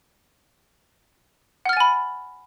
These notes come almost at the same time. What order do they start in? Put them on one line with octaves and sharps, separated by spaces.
F#5 F6 A6 G#5 B5